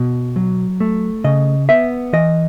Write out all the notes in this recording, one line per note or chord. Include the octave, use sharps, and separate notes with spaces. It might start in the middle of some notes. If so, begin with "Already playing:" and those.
Already playing: B2
F#3
A3
C#3 D#5
B3 E5
E3 D#5